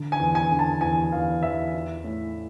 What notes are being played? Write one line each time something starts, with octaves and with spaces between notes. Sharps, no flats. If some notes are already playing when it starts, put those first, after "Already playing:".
Already playing: D3
G#5
E2
G#5
D3
A5
E2 G#5
E2 F5
E2 E5
E3
A2